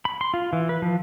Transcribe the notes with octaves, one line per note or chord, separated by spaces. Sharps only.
B5
C6
F4
E3
B4
F3